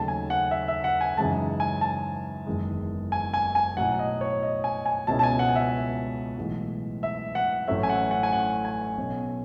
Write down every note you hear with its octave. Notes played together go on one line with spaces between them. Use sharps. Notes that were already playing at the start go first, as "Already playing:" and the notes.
Already playing: D#2 C#3 F#3 A3 C#4 A5
G#5
F#5
E5
E5
F#5
G#5
F#2 C#3 E3 G#3 D#4 A5
G#5
A5
F#1 E2 D#3 G#3
G#5
G#5
G#5
B1 A2 F#3 F#5
D#5
C#5
D#5
G#5
G#5
C#2 B2 G#3 C#4 E4 A5
A5
G#5
F#5
E5
B1 A2 E3 G#3
E5
F#5
A1 A2 F#3 A3 C#4 E5
G#5
F#5
F#5
G#5
F#5
G#5
B1 B2 A3 C#4